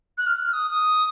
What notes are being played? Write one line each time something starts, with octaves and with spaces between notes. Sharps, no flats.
F#6
F6
F#6
F6
D#6
D#6